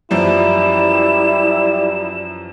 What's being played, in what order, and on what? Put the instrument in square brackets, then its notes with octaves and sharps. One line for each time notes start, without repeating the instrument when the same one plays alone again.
[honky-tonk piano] F#2 E3 F3 [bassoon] G3 [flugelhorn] E4 [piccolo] E7